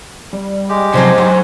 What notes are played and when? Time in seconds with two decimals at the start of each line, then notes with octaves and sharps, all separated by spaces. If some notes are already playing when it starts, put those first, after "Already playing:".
0.33 G3
0.69 G#3 G4
0.94 G#2 C3 F3 F#3 C5 G#5
1.18 F#3